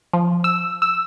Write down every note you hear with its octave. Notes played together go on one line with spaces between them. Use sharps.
F3
E6
E6